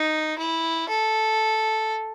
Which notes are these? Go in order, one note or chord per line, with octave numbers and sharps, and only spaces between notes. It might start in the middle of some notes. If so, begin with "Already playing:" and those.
Already playing: D#4
E4
A4